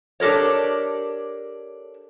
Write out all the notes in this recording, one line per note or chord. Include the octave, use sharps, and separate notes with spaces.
D4 G4 A4 A#4 C#5